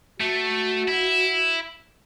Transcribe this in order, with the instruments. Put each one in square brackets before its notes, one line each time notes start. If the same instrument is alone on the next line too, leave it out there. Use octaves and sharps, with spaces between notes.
[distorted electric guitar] A3 [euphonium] F#4
[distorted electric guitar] E4